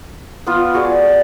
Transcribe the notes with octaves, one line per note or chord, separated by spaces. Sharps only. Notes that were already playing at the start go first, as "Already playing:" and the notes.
B3 F4
F#4 G#4 D5